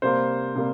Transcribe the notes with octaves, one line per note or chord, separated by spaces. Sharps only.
C3 G3 A#3 C5
C3 G3 A#3